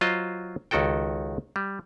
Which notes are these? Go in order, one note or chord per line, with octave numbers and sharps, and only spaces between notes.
F#3 F4 C5 D#5
C#2 D#3 F#4 A4 G5
G3